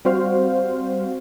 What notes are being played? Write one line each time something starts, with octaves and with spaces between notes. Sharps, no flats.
G3 C4 F#4 C5 F5